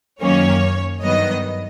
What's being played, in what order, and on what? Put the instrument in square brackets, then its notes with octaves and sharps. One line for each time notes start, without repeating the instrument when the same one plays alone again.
[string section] F#2 D#3 F#3 A#3 C#4 C#5
G2 D#3 F#3 B3 D#5